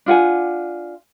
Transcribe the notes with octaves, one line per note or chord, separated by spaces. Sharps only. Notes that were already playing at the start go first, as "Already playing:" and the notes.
D4 F4 F#5 G#5